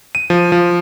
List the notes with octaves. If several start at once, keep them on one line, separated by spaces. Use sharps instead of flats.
D#7
F3
F3